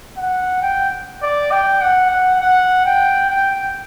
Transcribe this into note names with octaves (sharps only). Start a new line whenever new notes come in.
F#5
G5
D5
G5
F#5
F#5
F#5
G5
G5